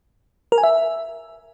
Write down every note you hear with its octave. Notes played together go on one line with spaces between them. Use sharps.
A#4
G#5
E5